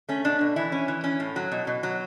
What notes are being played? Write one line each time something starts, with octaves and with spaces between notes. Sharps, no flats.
A3 C#4
B2 D4
B2
E3 E4
C#4
E3
C#4
A2
F#3
B2
B2
F#3